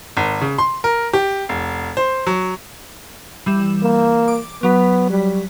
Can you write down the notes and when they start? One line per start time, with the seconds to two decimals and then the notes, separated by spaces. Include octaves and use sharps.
0.17 G#1
0.41 C#3
0.58 C6
0.84 A#4
1.13 G4
1.49 F1
1.97 C5
2.27 F#3
3.46 E3 G3 E7
3.83 A#3
4.28 D6
4.63 F#3 B3 B6
5.10 G3